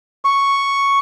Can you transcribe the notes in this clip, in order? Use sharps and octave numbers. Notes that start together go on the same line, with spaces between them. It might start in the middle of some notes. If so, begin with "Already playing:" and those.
C#6